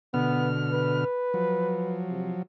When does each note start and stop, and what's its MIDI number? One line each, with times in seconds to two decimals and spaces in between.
0.14 1.04 47
0.14 1.04 50
0.14 0.50 59
0.14 1.04 89
0.71 2.00 71
1.34 2.42 53
1.34 2.42 54
2.09 2.32 48